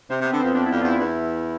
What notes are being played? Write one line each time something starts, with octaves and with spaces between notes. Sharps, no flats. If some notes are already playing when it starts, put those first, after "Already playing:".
C3 C4
C3
B3
D3
F2 C4
F2 D4
F2 E4
F4
E2 E4
E2